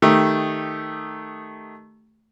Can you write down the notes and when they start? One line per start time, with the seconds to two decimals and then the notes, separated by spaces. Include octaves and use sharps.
0.02 D#3 A3 D#4 G4